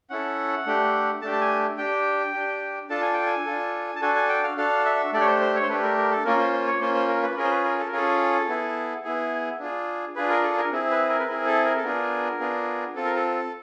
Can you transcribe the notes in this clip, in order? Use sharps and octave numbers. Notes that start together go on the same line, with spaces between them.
C#4 E4 A4 F#5
A3 D4 G4
A3 D4 G4 A5
A5
G#5
D4 G4 G5
D4 G4
D4 F4 A4 A5
G#5
G5
G#5
D4 F4 A4
A5
D4 F#4 A4 G#5
G#5
G5
F5
D4 F#4 A4 F5
E5
A3 D4 G4 D5
C#5
C5
C5
C#5
C5
A3 D4 G4 B4
A#4
A#4
A4
A#3 C#4 F4 A#4
C5
C5
C#5
A#3 C#4 F4 C5
C5
A#4
B4
C#4 F4 G#4 A#4
C5
B4
A#4
A4
A#4
C#4 F4 G#4 A4
B3 E4 G#4
B3 E4 G#4
D4 F4 G#4
D4 F4 G#4 B4
A#4
A4
A#4
C4 E4 G#4
B4
A#4
B4
C4 E4 G#4 A#4
A4
A#4
A4
B3 D4 F4 G#4 A#4
B3 D4 F4 G#4
C4 F4 A4
A#4
A4